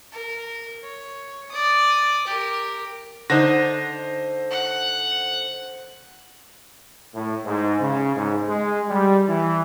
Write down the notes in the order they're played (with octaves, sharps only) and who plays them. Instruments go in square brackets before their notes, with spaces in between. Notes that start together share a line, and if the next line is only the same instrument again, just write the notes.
[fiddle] A#4
C#5
D5 D#6
G4 A#4
[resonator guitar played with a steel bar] D3 D#4 [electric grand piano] C5 A#6
[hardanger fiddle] F#5
[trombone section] A2
G#2
C#3
G#2
G#3
G3
E3